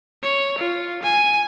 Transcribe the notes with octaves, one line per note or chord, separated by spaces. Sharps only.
C#5
F4
G#5